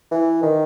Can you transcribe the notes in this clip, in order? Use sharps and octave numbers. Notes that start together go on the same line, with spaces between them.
E3
D#3